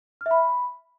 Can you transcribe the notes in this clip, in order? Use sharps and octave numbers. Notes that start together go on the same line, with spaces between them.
F6
E5
B5